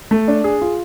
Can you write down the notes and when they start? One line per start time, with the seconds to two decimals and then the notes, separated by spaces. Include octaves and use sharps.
0.11 A3
0.28 D4
0.44 G#4
0.62 F4